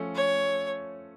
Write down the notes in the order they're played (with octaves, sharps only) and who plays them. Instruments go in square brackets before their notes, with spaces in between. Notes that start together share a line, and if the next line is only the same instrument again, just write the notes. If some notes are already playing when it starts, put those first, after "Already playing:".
Already playing: [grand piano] F3 A3 C#4 A4
[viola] C#5